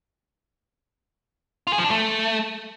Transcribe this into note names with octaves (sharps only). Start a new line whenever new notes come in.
F4
G#4
F3
D4
A3